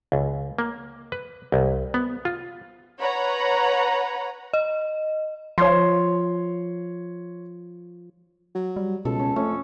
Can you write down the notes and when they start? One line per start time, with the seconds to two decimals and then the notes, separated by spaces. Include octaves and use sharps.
0.12 C#2
0.58 A#3
1.12 B4
1.52 C2
1.94 B3
2.25 F4
2.99 B4 C#5 F#5 A#5 B5
4.53 D#5
5.58 F3 C#5 C6
8.55 F#3
8.77 G3
9.05 C#2 B2 A4
9.19 C#4
9.36 F2 A3 C#4